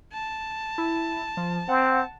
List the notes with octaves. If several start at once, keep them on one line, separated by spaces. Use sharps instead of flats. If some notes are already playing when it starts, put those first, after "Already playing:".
A5
E4
F3
C4 F#5